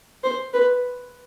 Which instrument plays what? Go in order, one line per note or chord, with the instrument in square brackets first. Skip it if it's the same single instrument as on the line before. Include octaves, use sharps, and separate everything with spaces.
[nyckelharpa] C5
B4